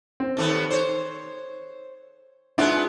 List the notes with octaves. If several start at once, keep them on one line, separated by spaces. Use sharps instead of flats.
C4
D#2 A3 B3
C5 C#5
G#3 B3 D4 E4 F4 D5